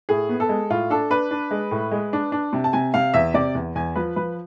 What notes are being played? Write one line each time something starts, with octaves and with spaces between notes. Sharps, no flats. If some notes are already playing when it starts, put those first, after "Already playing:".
A2 G#4
B3
A4
G#3
A2 F4
D4 A4
D4 B4
D4
G#3
A2
G#3
D4
D4
C3
A5
C3 G#5
C3 F5
E2 E5
C3 D5
E2
E2 G#5
F3 B4
F3 B4